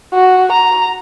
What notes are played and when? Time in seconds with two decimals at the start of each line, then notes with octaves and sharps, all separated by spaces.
0.14 F#4
0.52 A#5